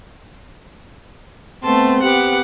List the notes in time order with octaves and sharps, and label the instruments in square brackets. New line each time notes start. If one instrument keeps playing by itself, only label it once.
[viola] A3 [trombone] B3 [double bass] C4 [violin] A5 C6
[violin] B3 D6 [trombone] G4 [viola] F#5